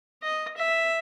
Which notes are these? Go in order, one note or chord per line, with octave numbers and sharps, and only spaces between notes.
D#5
E5